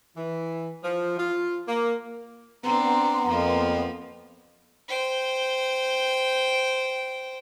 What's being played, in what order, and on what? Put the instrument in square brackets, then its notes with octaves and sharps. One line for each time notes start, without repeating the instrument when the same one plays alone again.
[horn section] E3
F3
F4
A#3
[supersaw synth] B3 [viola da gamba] C4 D4 [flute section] F#5 A#5 C6
[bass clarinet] F2 [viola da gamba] F3 A#3
[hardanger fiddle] C5 G5